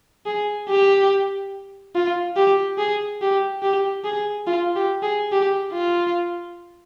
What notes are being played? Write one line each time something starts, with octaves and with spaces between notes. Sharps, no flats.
G#4
G4
F4
G4
G#4
G4
G4
G#4
F4
G4
G#4
G4
F4